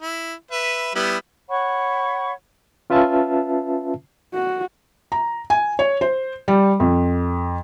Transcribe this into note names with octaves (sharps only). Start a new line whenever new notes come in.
E4
B4 E5
G3 B3 E4
C#5 F#5 B5 C#6
C#4 F4 B4 E5 A5
F#4
A#5
G#5
C#5
C5
G3
F2